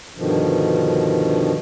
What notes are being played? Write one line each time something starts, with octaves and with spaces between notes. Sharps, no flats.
G2 B2 D3 D#3 F3